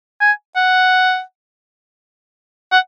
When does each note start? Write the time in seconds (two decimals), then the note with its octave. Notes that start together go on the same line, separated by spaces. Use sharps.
0.20 G#5
0.56 F#5
2.72 F#5